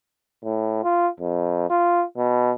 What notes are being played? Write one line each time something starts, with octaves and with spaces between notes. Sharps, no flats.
A2
F4
F2
F4
B2